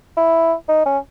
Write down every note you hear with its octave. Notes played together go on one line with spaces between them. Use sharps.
E4
D#4
C#4